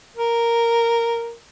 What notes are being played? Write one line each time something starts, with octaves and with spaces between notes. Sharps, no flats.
A#4